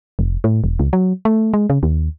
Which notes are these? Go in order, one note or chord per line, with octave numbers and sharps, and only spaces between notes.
F1
A2
E1
C#2
F#3
A3
G#3
C#3
D#2